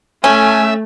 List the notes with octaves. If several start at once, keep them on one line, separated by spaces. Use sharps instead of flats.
A3 C#4 E5 G#5